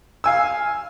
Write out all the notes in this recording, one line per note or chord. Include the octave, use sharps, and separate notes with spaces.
F5 G#5 E6